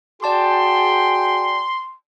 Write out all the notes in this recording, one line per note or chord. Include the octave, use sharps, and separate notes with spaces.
F#4 G#4 D5 G5 A5 C6 D6